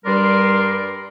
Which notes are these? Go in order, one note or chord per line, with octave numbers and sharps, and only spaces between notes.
G2 G3 A#4 D5 C6